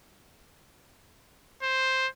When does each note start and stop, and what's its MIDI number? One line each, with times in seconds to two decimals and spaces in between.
1.63 2.08 72